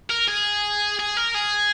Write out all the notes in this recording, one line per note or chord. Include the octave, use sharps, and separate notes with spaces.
A#4
G#4
G#4
A#4
G#4